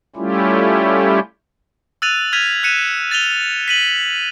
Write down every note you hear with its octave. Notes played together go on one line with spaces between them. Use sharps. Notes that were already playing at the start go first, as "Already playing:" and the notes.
G3 A3 C#4 E4 F4 G4
E6 F#6 A6 D#7 F7
F6 G#6 B6 D#7 F7
F#6 B6 C#7 D#7 E7
A6 D#7 F7 G7
B6 D#7 F#7